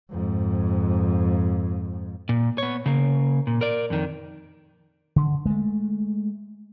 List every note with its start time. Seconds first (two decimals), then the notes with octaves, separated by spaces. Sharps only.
0.11 F2 G#2
2.29 A#2
2.58 B3 C#5
2.86 C#3 A#3
3.47 A#2
3.61 A#4 D5
3.90 F2 D#3
5.16 D3
5.46 G#3 A3